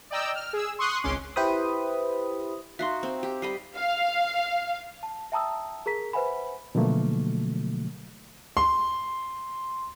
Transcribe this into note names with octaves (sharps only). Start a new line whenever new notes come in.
D5 D#5 G5 A#5 E6
F6
G#4 E6
C6 C#6 D#6 F#6 C7
G#1 C#2 C#4 C6 D6
E4 G4 B4 C5 B5 D#6
D#4 F#4 E5 F5 C6
C4
G4
G3 D#5 B5 C7
F5
A5
E5 G5 A5 A#5 D#6 E6
G#4 A#4 A#5 B6
B4 C5 E5 F#5 G#5 B5
B2 D3 F3 F#3 A3 A#3
C6